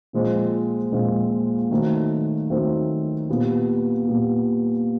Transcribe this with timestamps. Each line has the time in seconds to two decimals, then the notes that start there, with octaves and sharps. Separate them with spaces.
0.13 A#2 F3 G#3 C4
0.92 A#2 F3 G#3 C4
1.71 D#3 F#3 A3 C4
2.50 D#3 F#3 A3 C4
3.29 A#2 G3 B3
4.07 A#2 G3 B3